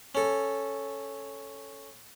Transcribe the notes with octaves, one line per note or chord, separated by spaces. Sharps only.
C#4 A4